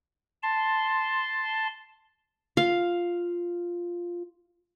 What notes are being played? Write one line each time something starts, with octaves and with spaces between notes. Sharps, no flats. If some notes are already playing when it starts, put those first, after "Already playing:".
A5 C6
F4 F5